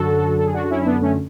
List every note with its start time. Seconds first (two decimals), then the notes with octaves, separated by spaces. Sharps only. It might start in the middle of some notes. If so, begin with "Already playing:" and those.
Already playing: F#2 D3 F#3 F#4 A4
0.39 A4
0.46 G#4
0.54 D4 F#4
0.66 F#4
0.70 C#4 E4
0.81 E4
0.85 B3 D4
1.01 A3 C#4